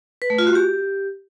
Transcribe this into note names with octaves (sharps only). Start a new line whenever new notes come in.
B4
A3
F4
F#4
G4